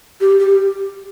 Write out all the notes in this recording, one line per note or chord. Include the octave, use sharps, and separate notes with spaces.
G4
G4